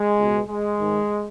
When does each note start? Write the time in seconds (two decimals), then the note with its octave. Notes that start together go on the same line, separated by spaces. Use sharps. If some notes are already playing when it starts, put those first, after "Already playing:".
Already playing: G#3
0.19 C#2 B2
0.49 G#3
0.79 G#2 D#3